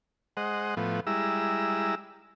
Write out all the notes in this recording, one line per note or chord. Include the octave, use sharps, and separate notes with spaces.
G#3 C5 D#5 F#5
A2 F3 B3
G3 G#3 E4 A#5 E6